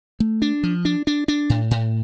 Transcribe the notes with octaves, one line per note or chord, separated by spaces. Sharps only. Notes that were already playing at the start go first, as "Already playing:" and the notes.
A3
D4
F3
D4
D4
D4
A2
A2